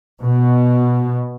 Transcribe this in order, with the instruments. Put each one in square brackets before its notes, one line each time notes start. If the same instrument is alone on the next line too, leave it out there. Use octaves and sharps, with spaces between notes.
[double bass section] B2